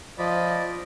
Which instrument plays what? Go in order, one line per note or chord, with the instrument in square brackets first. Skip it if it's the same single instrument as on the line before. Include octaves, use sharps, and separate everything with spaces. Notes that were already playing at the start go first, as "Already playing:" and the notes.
[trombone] F3 [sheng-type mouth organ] D5 D#5 B5